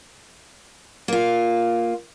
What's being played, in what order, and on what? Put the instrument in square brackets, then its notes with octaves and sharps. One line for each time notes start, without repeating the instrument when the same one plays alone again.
[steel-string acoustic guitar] A#3 F4